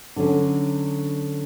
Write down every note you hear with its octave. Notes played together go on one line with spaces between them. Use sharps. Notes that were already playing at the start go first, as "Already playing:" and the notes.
D3 F#3 C#4